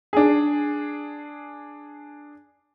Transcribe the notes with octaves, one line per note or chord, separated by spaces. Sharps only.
D4 G#4